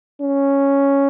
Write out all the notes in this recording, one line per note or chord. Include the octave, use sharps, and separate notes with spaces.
C#4